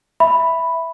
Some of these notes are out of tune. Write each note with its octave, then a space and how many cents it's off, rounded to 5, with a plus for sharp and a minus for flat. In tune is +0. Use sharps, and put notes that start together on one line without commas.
E5 +0 B5 +0